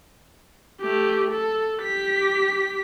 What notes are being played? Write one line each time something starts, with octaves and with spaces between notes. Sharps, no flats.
A3 G4
A4
G4 B6